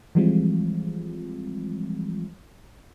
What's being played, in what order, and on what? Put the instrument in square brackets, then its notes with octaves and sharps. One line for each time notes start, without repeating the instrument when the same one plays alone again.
[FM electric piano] E3 F3 G3 G#3 C4 F4